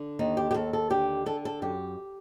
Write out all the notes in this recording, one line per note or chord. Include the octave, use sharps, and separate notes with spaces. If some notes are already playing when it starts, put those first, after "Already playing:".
Already playing: D3
D#2 D#4
G4
G4
D#2 A4
A4
D3 G4
D3 A4
A4
F#2 G4